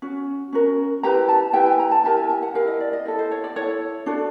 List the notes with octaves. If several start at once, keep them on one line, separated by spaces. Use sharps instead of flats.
C#4 F#4
C#4 F#4 A#4
E4 G4 B4 A#5
A5
E4 G4 B4 G5
G#5
A#5
A5
E4 G4 A#4 A5
G#5
G#5
F#5
E4 G4 A#4 F5
D#5
D5
D#5
E4 A4
C5
C#5
D5
E4 A4 C#5
D4 F#4 A4